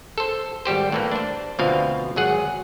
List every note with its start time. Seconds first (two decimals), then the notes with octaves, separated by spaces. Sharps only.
0.18 A4 C5
0.65 G#1 G3 G4 C5
0.92 A2 E3 A#3
1.12 D4 C5
1.59 D2 B2 F3 C4 F5
2.16 G#1 F#3 G#4 F#5